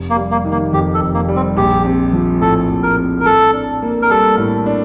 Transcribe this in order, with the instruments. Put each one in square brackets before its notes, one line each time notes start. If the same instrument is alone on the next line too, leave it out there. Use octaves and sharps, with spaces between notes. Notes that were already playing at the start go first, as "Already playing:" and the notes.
Already playing: [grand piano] F1
[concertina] A#3
[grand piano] G3
[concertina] A#3
[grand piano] D#3
[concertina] A#3
[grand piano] F2 [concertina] G4
[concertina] A4
[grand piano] F1
[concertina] A#3
[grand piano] G3
[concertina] C4
[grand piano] A#1 [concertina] G4
[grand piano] C4
F3
[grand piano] A2 [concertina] A4
[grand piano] A#1
[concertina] A#4
[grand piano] C4
[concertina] A#4
[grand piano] A2 [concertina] A4
[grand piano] D4
A#3
[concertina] A#4
[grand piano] G3 [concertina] A4
[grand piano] A2
D4